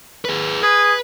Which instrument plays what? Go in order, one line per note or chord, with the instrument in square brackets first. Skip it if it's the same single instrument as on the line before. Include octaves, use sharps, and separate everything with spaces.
[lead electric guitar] G#4 B4
[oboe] G#4 [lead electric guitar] B4